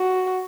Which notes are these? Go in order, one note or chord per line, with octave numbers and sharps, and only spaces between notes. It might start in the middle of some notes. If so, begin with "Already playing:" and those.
Already playing: F#4